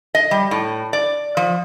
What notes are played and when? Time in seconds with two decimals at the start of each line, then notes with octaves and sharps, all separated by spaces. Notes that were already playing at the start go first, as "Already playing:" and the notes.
0.15 D#5
0.31 G3
0.51 A2
0.93 D5
1.37 F3